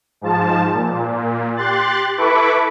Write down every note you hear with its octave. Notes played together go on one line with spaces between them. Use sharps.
G#2 F3 A5
A#2
G4 C6 F#6 A6
E4 A4 B4 B5 C#6 D6